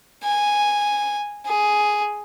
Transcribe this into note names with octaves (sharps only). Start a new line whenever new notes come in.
G#5
G#4